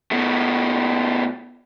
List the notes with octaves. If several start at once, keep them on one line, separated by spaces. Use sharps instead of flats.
B2 A3